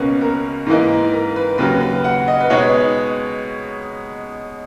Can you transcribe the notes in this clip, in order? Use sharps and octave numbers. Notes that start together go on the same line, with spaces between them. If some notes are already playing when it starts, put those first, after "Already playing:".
Already playing: C#2 B2 A#3 C#4 B4
A#4
G#2 E3 A#3 D#4
A#4
B4
D#2 C#3 F#3 B4
B4
F#5
D#5
B4
B2 G#3 B3 D#4 C#5